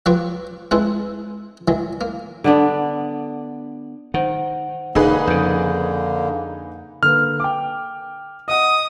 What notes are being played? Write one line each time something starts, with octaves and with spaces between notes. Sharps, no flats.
F3 F#3 G4 B4 G5 C#6
G#3 C4 D#4 E4 A4 B4
D#3 E3 F#3
A#3
D3 B3 D4
D#3 C5 F#5
E1 D3 A#3 D#4 G#4 B4
F2 C#3 G6
D3 A#3 B4 F6
G5 D6
D#5 F#5 D#6